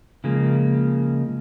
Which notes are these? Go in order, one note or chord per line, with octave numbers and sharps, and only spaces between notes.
C#3 F3 G#3 A#3